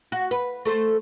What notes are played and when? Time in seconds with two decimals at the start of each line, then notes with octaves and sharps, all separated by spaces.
0.12 F#4
0.31 B4
0.65 A3 A4 C5